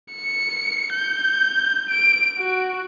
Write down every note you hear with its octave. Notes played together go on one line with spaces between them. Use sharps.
C#7
G6
D7
F#4